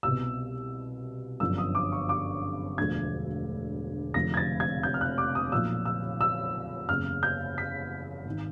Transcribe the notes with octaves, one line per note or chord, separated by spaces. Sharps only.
C2 B2 E6
G1 F#2 D3 F3 E6
D#6
D6
C#6
D6
E1 D2 D3 F3 G#6
F1 F2 D3 F3 A#6
G#6
A6
G#6
G6
F6
F#6
D6
D#6
B1 A#2 F3 E6
E6
E6
F#1 E2 C#3 F6
G6
B6
G#1 D#3